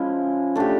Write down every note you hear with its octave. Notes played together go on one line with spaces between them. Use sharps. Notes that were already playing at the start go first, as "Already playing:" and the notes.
Already playing: F3 G#3 C#4 E4
A3 D4 G4